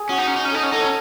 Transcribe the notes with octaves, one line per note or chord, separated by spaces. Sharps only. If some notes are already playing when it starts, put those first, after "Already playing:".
Already playing: G#4
C#4 F#4
D#4
C#4
D#4
C#4
D#4 A4
C#4
D#4 A4
C#4